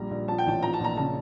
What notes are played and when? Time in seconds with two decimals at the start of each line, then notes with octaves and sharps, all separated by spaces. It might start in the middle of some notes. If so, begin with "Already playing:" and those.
Already playing: A#1 G3 A#5
0.11 A#1
0.28 F3 A5
0.38 G5
0.46 A1 A5
0.63 F3 A#5
0.73 A5
0.80 A#1 A#5
0.97 C#3 A5